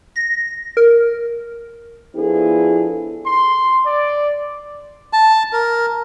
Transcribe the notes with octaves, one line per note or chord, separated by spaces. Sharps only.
A#6
A#4
F3 B3 D4 E4 G#4 A4
C6
D5
A5
A#4